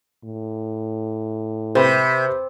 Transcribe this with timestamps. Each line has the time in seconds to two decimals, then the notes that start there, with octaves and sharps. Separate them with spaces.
0.24 A2
1.75 C3 B4 C5